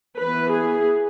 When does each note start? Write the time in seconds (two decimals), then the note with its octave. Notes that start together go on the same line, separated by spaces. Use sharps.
0.18 E3 B3 B4
0.52 G#4